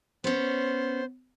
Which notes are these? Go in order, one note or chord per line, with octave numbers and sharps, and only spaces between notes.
B3 C#4 C5